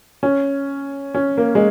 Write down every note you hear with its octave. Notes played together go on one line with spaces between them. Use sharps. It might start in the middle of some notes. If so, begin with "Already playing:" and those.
C#4
C#4
A#3
G#3